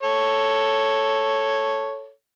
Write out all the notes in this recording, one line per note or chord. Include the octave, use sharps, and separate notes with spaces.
A4 C#5